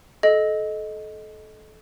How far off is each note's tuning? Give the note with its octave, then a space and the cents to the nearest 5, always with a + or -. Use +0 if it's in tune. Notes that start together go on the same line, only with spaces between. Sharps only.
A4 -25 D#5 +0